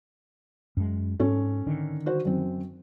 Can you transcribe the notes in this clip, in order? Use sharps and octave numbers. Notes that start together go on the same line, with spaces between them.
F#2 G#3
G#2 C#4 A4
D3 D#3
F#4 C5
F#2 C4